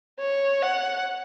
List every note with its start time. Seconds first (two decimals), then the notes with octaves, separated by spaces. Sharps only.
0.20 C#5
0.62 F#5